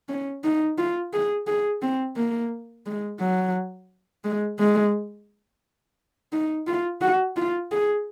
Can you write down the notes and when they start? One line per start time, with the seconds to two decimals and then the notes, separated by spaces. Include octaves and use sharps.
0.09 C#4
0.44 D#4
0.78 F4
1.14 G#4
1.47 G#4
1.82 C4
2.16 A#3
2.86 G#3
3.20 F#3
4.25 G#3
4.59 G#3
6.33 D#4
6.67 F4
7.01 F#4
7.37 F4
7.72 G#4